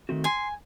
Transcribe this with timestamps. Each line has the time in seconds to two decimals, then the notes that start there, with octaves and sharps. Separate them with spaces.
0.09 D#3 A3 C4 F#4
0.24 G#5 C6